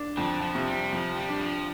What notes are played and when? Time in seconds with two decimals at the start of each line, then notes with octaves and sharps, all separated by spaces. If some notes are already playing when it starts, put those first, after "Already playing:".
Already playing: D4
0.17 F2 D3
0.42 F3
0.54 C3
0.67 G3
0.92 F2 F3
1.17 G3
1.28 D4
1.41 F3